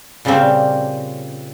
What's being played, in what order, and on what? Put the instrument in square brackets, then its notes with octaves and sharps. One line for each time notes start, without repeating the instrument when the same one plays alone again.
[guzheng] A#2 C#3 G3 A#3 C4 C#4